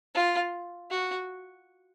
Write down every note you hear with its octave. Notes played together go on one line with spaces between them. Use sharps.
F4
F#4